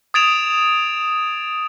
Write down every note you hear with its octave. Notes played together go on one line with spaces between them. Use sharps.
D#6 G#6 A6 D7 E7 F7